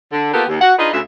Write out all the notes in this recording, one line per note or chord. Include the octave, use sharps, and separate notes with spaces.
D3
A#3 B3 F4 G4 A4 A#4
D#2
F#4 F#5
D4 D#4 F4 G#4 B4 D#5
D2 C#3 E5